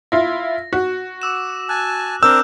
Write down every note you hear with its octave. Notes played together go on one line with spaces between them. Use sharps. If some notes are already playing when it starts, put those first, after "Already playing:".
E4 F4 A#6
F#4
D6 E6 E7
G#5 A5 F#6
C4 D4 A#4 E6 F6 G6